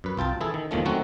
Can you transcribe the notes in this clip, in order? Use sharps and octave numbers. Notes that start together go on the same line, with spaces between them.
F#2 B4
C2 F4 G5 A5
E3 E4 G#4 A4
D#3
E2 A#2 D#3 F3 A3 C#4
D#3 F#3 A3 C4 C#4 F#4